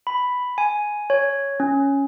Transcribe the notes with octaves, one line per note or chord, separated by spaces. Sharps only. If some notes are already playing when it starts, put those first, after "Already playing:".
B5
G#5
C#5
C#4